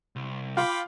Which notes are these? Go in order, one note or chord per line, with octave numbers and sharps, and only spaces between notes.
C2
F4 G5 B5 D6